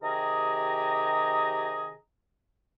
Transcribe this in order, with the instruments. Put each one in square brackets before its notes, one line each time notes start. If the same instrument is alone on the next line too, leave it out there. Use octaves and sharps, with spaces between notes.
[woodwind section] C3 D#3 G4 G#4 D#5 A#5